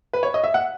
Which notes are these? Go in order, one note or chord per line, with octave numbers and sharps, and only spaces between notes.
B4
C#5
D#5
E5
F#5